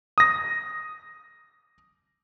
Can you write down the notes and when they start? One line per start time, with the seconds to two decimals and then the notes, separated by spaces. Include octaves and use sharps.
0.18 D#6 A#6